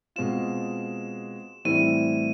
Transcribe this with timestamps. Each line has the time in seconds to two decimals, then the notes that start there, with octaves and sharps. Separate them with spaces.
0.16 B2 G#3 C4 F4 E7
1.65 A2 E3 G3 C4 E4 D#7